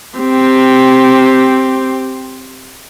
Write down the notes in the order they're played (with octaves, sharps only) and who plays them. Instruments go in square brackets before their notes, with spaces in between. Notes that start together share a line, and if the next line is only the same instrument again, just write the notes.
[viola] C4 G4